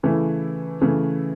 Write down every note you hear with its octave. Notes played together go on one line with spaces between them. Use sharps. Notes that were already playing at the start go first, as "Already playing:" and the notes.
C#3 E3 A3 E4
C#3 E3 A3 E4